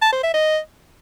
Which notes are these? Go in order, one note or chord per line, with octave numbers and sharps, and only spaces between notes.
A5
C5
E5
D#5